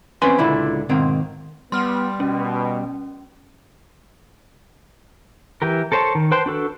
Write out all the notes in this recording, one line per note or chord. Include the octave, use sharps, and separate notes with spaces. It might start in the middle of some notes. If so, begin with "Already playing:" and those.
E2 C4 C#4 B4 G#5 C6
C#2 A#2 D3 E4 B5
G#2 B2 D#3 A#3 C4
G3 B3 C6 F6
B2 C#4
E3 G4 A#4
A4 A#4 C5 C#5 A5
D#3
B4 C5 G5 A5 C6
D4 F#4 A4 B4